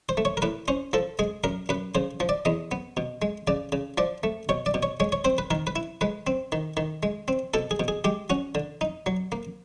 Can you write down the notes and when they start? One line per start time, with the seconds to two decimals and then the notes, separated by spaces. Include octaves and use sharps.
0.09 C5
0.17 A3
0.25 C#5
0.37 A#4
0.42 A2 B4
0.68 C#4 C5
0.93 F3 A4
1.19 G#3 G#4
1.44 F#2 A#4
1.69 F#2 B4
1.95 C#3 C5
2.20 F3
2.29 D5
2.45 E2 D#5
2.72 B3
2.97 B2
3.22 G#3
3.47 C#3 D5
3.72 C#3
3.98 F3 D5
4.23 A3
4.49 B2 C#5
4.66 D5
4.74 B2
4.83 C#5
5.00 G#3 C#5
5.12 C#5
5.25 C4 C5
5.38 B4
5.51 D#3 A#4
5.67 B4
5.76 E4
6.01 G#3 B4
6.27 C4
6.52 D#3
6.77 D#3
7.03 G#3
7.28 C4
7.54 B2 A4
7.71 G#4
7.80 B2
7.88 G#4
8.04 G#3 G4
8.30 C#4 F#4
8.55 D3
8.81 D#4
9.06 F#3
9.32 A#3